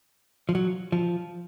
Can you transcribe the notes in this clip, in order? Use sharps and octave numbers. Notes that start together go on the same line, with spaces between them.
F3
F#3
F3